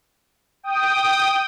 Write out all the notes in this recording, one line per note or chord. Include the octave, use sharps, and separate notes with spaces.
G5 D#6